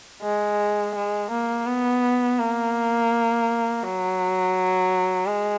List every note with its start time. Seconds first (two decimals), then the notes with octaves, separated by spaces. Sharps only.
0.22 G#3
0.95 G#3
1.30 A#3
1.66 B3
2.39 A#3
3.83 F#3
5.26 G#3